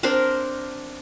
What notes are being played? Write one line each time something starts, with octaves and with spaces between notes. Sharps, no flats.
C4 D4 A#4 C5